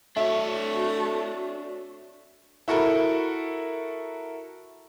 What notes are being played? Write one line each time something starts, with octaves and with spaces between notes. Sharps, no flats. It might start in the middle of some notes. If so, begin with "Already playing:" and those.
A3 D4 F#4 C#5 E5
E4 F#4 A4 A#4 B5